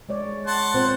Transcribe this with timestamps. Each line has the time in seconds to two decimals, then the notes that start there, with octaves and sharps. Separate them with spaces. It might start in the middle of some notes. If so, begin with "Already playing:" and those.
0.09 G#3 C#5 D5
0.47 F#5 A5 C6
0.74 A#2 C4 C5